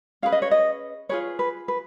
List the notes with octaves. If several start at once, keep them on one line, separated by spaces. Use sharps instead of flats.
C#4 G#4 B4 F5
D#5
C#5
D#5
F4 G#4 B4 C#5
B4
B4